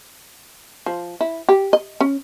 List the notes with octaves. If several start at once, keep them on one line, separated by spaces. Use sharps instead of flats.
F3
E4
G4
D#5
C#4